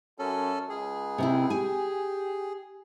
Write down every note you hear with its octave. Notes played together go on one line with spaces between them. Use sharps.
F#2 C#4 A4
C#2 G#4
C3 C4 E4
G4 G#5